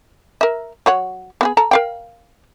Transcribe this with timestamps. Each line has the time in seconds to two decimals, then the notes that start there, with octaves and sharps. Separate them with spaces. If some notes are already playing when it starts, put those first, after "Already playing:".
0.41 A#4 E5
0.86 F#3 C#5 F#5
1.41 B3 F#4 G#4
1.57 A4 A5 A#5
1.71 A#4 F5 G5